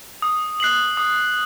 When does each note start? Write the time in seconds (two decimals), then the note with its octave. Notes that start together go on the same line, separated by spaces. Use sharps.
0.22 D#6
0.60 F#6 C7 F#7
0.97 D#6